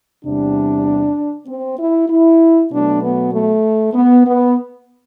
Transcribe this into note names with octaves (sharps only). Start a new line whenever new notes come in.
E2 C3 G3 D4
C4
E4
E4
B2 F#3 A3 D4
B3
A3
B3
B3